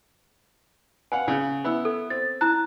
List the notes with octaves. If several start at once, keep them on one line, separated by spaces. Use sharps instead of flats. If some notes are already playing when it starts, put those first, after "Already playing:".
B4 F5 F#5 G#5
C#3
B3 E4 E6
A4
C4 A6
E4 A5 A#5 F#6